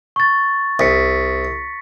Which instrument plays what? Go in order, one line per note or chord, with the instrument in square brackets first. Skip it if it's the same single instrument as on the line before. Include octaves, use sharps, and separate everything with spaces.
[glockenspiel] C#6 A6
[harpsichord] C2 [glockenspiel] A#6 B6 C#7